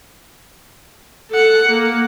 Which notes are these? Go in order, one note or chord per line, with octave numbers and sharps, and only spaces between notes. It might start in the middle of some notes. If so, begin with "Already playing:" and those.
A4 F#5
A#3